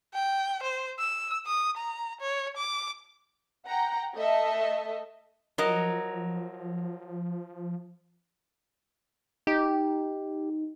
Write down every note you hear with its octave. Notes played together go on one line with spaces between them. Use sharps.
G5
C5
E6
D#6
A#5
C#5
D6
F#5 G5 A#5
A3 A4 D#5 E5
F3 F#3 A#4 D#5
D#4 G4